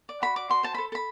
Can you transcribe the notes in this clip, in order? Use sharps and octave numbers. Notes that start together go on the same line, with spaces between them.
D5
F#4 B5
D5 D6
F#4 C6
C5 A5
A4 B5
A4 B5